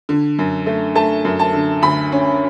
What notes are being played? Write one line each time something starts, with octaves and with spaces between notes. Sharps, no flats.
D3
F#2
A3
A3 A5
F#2
A5
D3
D2 B5
C#4